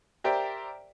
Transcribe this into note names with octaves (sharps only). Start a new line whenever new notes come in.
G4 A#4 C5 D5 E5 G5